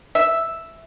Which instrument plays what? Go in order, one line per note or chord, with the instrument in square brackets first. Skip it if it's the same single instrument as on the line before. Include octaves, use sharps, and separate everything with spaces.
[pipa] E5